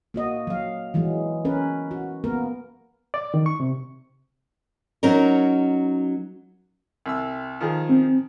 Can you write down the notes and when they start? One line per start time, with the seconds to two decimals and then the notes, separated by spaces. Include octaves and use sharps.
0.14 A#3 F#4 D#5
0.47 F#3 F5
0.94 E3 F#3 G#3
1.45 C#4 A#4 B4
1.91 F#4
2.24 A#3 B3 A#4
3.14 D5
3.34 D#3
3.46 C#6
3.60 C3
5.03 F#3 C#4 D#4 A#4
7.06 C2 E6
7.61 D#3 F3 G#4
7.89 C4